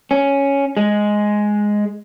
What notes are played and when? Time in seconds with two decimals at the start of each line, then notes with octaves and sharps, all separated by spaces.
0.11 C#4
0.77 G#3